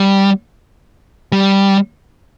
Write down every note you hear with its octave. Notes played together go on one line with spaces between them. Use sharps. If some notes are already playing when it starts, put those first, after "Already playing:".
Already playing: G3
G3